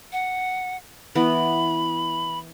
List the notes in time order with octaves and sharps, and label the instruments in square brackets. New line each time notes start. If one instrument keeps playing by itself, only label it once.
[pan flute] F#5
[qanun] E3 B3 [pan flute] B5